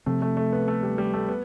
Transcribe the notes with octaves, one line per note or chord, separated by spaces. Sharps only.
C3 F3 A3 C4
A3
A3
B3
A3
G3
G3
A3
B3